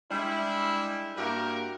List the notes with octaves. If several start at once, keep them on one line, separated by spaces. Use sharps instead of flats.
G3 G#3 D4 E4
G2 A#3 E4 F#4 G4 A#4